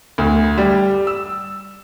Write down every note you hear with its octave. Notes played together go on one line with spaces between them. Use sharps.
D2
G3
E6